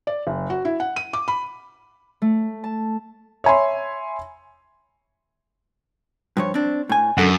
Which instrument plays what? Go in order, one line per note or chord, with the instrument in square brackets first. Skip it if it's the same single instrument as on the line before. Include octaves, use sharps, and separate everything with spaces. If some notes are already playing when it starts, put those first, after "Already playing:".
[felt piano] D5
F#1
F#4
E4
F#5
D#7
D6
B5
[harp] A3
A5
[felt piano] C#5 E5 G#5 B5 C6
[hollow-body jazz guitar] G2 F3 C#5
C4 D4
A2 G#5
[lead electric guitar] F#2 [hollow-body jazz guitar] D3 A4 F#5